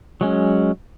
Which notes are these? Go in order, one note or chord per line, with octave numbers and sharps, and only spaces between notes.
F#3 G#3 C#4